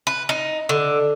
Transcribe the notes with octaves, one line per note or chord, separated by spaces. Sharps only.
B4
D#4
D3